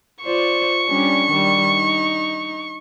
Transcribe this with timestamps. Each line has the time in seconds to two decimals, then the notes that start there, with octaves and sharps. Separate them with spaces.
0.24 F4 C5 D5 C#6
0.88 G3 C#4 D4
1.32 D#3 G3
1.72 D#4